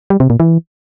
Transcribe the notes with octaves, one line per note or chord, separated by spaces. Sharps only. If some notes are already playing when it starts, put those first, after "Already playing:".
G3
C3
A#2
E3